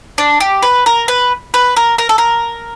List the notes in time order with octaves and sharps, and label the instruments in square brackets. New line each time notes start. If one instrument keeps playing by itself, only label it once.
[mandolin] D4
G4
B4
A#4
B4
B4
A#4
A#4
A4
A#4